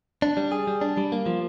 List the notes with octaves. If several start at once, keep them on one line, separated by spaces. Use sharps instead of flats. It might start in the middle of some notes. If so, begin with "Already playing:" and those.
D4
G3
G#4
G3
D4
G3
A#3
F3